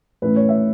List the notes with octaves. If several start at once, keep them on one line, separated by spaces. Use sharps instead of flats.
A2 E3 A3 C#4 B4
C#5
E5